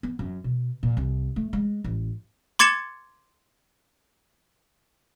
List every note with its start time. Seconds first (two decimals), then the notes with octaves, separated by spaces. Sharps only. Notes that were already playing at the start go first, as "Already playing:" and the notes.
0.03 B3
0.19 F#2
0.44 B2
0.83 A#2
0.97 C2
1.36 A3
1.53 G#3
1.84 A1
2.59 C6 D6 G#6 A6 C#7 E7